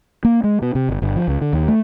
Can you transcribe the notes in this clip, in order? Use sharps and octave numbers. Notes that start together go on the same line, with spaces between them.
A#3
G#3
B2
C3
G1
G1
F3
C#2
D3
D#2
A3